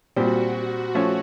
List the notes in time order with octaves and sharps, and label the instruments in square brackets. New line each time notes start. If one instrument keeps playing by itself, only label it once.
[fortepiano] A#2 G3 C4 [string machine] F#4
[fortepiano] F3 A3 C#4